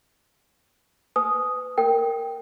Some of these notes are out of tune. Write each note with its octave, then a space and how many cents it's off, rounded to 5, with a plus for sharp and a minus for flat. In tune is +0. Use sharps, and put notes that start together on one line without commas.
B4 +30 G#5 +35 D#6 +0
A#4 -10 G5 +0